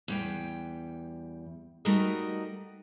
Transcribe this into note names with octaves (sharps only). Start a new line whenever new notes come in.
E2 G3 G5
G3 A3 D#4 F#4 A#4 D#5